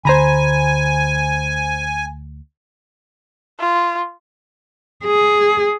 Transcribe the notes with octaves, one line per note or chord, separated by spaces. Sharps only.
D2 D3 C5 G#5 A#5 B5
F4
G#4